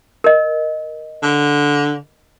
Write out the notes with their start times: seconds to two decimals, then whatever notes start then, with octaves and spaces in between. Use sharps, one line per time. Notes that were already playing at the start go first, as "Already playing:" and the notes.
0.24 A#4 D#5
1.23 D3